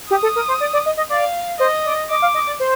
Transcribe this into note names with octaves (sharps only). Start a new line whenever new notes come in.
G4 D#6
A4
A#4
C5
D5
D5
D#5
D#5
D5 F5
C5 D#5
D5
D#5 D6
F5
D#5
D5
C5